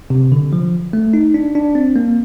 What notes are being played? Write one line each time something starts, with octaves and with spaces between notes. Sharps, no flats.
C3
D3
F3
A3
D#4
D4
D4
C4
A#3